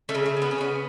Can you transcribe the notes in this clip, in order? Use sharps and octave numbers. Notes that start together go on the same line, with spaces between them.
A3 C#4
C#3
A3
C#3
B3
C#4
C#3 B3